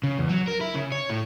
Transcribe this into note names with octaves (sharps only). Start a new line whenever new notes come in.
C#3
E2
F#3
A#4
E4
C#3
C#5
A2